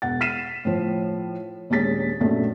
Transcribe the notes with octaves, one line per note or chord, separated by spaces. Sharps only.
E1 F#5 A6
F6 B6 C7 D#7 E7
A2 F3
A#1 D#2 G#3 C#4 A6 B6
A#1 F#2 A3